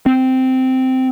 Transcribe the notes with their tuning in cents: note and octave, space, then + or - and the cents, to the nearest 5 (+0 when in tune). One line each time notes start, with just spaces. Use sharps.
C4 -10